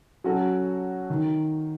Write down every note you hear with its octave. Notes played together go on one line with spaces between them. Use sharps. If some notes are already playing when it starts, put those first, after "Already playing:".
F#3 C#4 F#4 A4
D#3